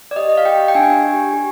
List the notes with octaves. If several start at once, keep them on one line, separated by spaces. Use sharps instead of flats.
D5
G4 D#5
D#5
F5
G4 G5
G5
D4 G#5
G4
G4